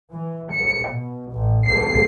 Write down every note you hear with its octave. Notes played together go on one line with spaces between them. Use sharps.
E3
C#7
B2
A1
C7